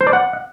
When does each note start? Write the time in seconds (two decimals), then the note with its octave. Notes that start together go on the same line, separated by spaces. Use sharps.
0.01 C5
0.07 D5
0.13 F#5